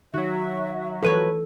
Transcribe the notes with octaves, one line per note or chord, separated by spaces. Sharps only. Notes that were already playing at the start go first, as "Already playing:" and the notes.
D#3 F#3 F#4 E5
E3 F3 A4 B4 C#5